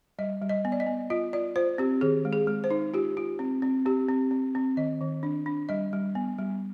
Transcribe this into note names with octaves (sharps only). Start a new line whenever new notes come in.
G3 D#5
G3
D#5
B3
D5
D#5
B3
F4 D#5
F4 D5
F4 C5
C4 G4
D#3 G#4
G#3
G#4
G#3
C5
D#4
F4 G4
F4
C4
C4
C4 G4
C4
C4
C4
D#3 D#5
D#3
D4
D4
G3 D#5
G3
B3
G3